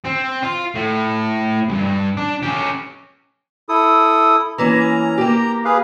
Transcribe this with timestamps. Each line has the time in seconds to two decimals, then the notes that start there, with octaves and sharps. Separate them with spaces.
0.05 C4
0.43 F4
0.75 A2
1.68 C2 G2
2.17 D4
2.43 C#4 G4
3.69 E4 A4 D#6
4.58 E3 A#3 C#4 A#5
5.18 A#3 G4
5.65 G#4 B4 F5